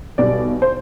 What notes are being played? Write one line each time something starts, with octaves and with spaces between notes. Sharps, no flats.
B1 B2 G3 B3 D5
C5